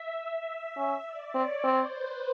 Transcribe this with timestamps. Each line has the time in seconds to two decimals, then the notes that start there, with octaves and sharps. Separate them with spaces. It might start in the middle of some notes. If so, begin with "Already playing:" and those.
Already playing: E5
0.48 E5
0.77 C#4
1.06 D5
1.35 C4 C#5
1.64 C4 C5
1.92 B4